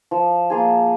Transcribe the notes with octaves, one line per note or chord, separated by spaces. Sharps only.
F3
A#3 F4 G#4